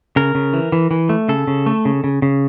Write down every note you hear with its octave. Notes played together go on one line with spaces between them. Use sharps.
C#3 A#4
C#3
E3
E3
E3
A3
C#3 A4
C#3
A3
C#3
C#3
C#3